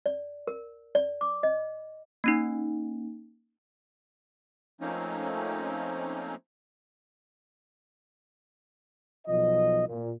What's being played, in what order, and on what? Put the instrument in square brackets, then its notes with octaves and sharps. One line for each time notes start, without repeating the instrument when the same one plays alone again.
[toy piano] D5
A#4
D5
D6
D#5
[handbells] A#3 C#4 D#4
[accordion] F3 A3 A#3 C4 C#4 D#4
[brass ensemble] B1 F3 D#5
A#2